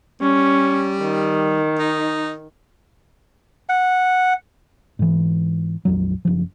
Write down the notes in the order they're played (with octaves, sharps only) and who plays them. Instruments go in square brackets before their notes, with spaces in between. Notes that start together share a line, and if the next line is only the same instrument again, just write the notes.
[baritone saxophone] G3 [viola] C#4
[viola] D#3
[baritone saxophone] D#4
[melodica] F#5
[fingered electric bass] G#2 E3
A#1 F2 F#3
F#1 F3